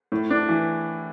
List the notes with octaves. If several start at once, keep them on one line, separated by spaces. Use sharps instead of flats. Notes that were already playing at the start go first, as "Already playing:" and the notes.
A2
D4
E3